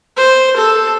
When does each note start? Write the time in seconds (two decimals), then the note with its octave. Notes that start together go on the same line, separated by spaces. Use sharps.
0.17 C5
0.57 A4